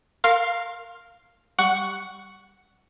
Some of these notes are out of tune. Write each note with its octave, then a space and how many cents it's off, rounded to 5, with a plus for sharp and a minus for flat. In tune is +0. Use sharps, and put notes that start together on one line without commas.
A#4 -15 F5 +0 C6 +30
G3 +0 F#5 +0 C#6 +10